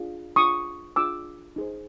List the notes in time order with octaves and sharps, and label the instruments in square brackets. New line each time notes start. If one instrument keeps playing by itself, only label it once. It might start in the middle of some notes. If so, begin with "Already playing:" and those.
Already playing: [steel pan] D4 F4 G#4
D4 F4 G#4 C#6 D#6
D4 F4 G#4 D6 E6
D#4 G#4 C5